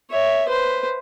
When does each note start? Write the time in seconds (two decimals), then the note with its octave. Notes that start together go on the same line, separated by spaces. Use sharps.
0.10 C#5 E5
0.48 B4 C5